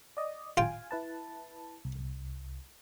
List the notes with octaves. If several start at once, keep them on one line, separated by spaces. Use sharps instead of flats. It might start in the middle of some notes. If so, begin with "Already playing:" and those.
D5 D#5
F4 F5 G5 G#5
E4 B4 A5
C2